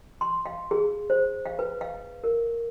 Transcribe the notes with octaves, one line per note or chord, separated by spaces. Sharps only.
C6
F5
G#4
C5
F5
B4
F5
A#4